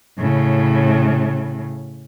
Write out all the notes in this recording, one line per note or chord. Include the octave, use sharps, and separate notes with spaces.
A2 C#3